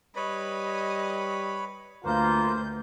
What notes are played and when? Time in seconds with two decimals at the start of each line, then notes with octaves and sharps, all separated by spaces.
0.16 G3 B4 C#5 D#5 B5
2.05 D2 A#3 F4 B4 C5 G6